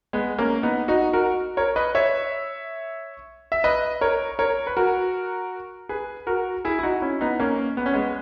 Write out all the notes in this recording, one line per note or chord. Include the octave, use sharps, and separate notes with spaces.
G#3 B3
A#3 C#4
B3 D#4
D#4 F#4
F#4 A#4
A#4 C#5
B4 D#5
C#5 E5
E5
B4 D#5
A#4 C#5
A#4 C#5
B4
F#4 A#4
G#4 B4
F#4 A#4
E4 G#4
E4
D#4 F#4
C#4 E4
B3 D#4
A#3 C#4
B3
C#4
G#3 B3